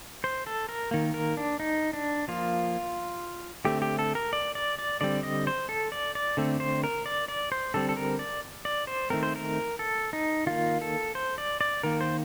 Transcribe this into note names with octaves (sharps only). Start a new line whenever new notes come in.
C5
A4
A#4
D#3 A#3
A#4
D4
D#4
D4
F3 A#3 F4
D3 A3 C4 G4
G4
A4
A#4
D5
D5
D5
D3 G3 C4 D5
D#5
C5
A4
D5
D5
D3 A3 C4
C5
A#4
D5
D5
C5
D3 G3 C4 A4
A4
A#4
D5
D5
C5
D#3 A3 C4 A#4
C5
A#4
A4
D#4
D#3 A#3 F4
A4
C5
D5
D5
D#3 A#3 A#4
C5